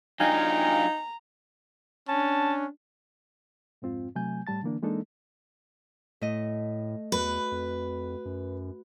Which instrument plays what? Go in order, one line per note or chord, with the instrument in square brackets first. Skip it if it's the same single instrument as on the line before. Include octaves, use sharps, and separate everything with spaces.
[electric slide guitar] F#3 D4 F4 [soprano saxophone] D#4 [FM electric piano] F5 G5 G#5 [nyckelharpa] A#5
[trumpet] C#4 [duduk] D4 [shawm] A5
[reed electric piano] F2 G#2 C4 F4
C3 F#3 A3 G#5 G6
A2 G3 A5 A6
D3 E3 A#3 D4
E3 G#3 A#3 D4 D#4 A4
[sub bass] A2 [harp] A3 D#5
[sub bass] E2 [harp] F#4 [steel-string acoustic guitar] B4
[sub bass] F2
F#2